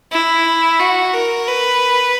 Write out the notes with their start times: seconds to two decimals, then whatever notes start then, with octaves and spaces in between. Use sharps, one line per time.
0.11 E4
0.79 F#4
1.14 A#4
1.48 B4